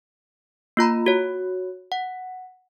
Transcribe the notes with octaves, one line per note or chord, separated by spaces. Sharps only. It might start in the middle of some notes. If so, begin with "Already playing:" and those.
A#3 F4 A#5 B5
F#4 C#5
F#5